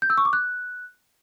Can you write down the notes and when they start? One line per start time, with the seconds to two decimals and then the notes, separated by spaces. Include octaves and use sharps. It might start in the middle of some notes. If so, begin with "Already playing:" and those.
0.02 G6
0.10 E6
0.18 C#6
0.25 D6
0.33 F#6